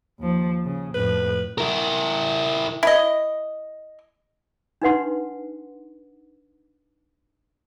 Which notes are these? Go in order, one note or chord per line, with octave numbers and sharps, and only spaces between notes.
D#2 F3
C#3
F2 A2 B4
E4 A#4
E4 D#5
D4 D#4 B4 F#5 C6